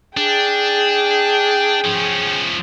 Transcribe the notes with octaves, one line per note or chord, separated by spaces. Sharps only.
D4 G#4 G5
F3 C#4